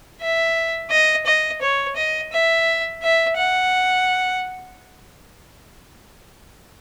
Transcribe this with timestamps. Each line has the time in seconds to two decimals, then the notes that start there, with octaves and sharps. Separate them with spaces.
0.21 E5
0.91 D#5
1.26 D#5
1.62 C#5
1.96 D#5
2.32 E5
3.02 E5
3.37 F#5